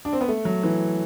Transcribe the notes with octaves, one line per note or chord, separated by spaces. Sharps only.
D4
C4
B3
A3
F#3
E3